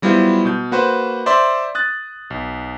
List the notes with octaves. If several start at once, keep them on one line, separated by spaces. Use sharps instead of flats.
F#3 G3 B3 E4 F4 C5
B2 G6
A#3 F#4 B4 C5
C5 D5 E5 C6
D#6 F#6 A6
B1